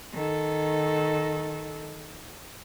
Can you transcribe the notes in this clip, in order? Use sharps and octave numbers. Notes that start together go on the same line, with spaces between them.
D#3 A4